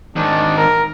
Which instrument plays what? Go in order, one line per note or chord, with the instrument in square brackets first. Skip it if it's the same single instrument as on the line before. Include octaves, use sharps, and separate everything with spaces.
[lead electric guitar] G#2 D#3 [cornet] D4
[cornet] A#4